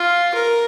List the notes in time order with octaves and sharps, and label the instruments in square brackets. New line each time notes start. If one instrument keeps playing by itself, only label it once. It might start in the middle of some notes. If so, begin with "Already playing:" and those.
Already playing: [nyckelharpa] F4
A#4